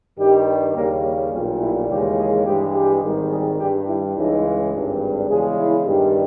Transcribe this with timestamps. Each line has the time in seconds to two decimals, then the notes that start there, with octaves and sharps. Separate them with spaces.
0.18 G2 D#3 G3 G4
0.75 D#2 C#3 G3 A#3
1.32 B1 A#2 G3 C#4
1.60 E4
1.88 D#2 C#3 E3 G#3 G4
2.17 G#4
2.45 G2 E3 G#3 G4
2.73 G4
3.02 G#1 G#2 D#3 G3
3.30 G#4
3.58 G2 G3 G4
3.87 E4
4.15 C#2 C#3 E3 G#3 D#4
4.72 G#1 G2 G3
5.28 E2 C#3 G#3 G#4
5.57 E4
5.85 G2 D#3 G3